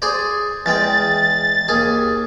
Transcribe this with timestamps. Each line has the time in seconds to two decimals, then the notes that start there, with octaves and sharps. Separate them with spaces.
0.02 G#4 C5 D5
0.66 E2 G#3 G5 A6
1.68 D#2 G#4